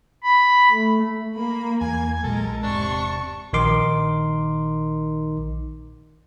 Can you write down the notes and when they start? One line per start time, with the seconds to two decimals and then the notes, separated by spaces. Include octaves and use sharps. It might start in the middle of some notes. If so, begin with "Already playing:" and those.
0.23 B5
0.71 A3
1.35 A#3 B5
1.81 E2 G#5 G#6
2.24 B1 A#2 F#3 G#3 A4 A#4
2.63 E1 G#2 C3 D4 C#6
3.53 A#1 D#3 D#4 A#4 C6 D6